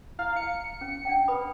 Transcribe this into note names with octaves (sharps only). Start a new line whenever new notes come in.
E4 F5
C#7
C#4
D4 F#5 G5
B4 B5 D#6